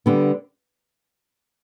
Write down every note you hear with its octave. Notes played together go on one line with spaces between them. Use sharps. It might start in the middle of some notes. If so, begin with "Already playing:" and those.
D3 G3 B3